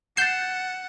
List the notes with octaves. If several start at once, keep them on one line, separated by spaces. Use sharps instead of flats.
F#5 G6 A6 C7 E7